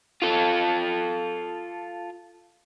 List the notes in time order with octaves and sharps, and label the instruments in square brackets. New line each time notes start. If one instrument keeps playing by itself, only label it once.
[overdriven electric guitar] F4 A4